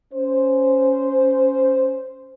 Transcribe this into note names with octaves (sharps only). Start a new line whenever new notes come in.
C#4 C5